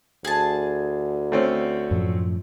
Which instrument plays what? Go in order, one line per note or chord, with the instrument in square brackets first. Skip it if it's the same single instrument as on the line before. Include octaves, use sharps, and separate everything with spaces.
[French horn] D2 [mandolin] G#4 A5
[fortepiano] A3 C4 C#4
[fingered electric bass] F#2 A2 F3